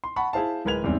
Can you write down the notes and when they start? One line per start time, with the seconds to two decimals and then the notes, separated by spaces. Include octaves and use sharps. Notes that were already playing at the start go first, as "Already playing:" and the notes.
0.04 C6
0.16 F#5 A5 B5 C#6
0.33 E4 G#4 C5 F5 A5
0.65 D1 G#3 A#4 B4 G#6 F7
0.83 F#1 E2 G#2 G3 C4